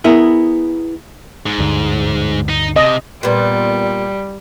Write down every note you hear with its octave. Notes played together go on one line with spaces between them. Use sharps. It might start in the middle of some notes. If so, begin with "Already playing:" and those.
B3 E4 G#4 A#4
G#2
D2 G2 D3
D#4
C3 D#5
A#2 G3 B3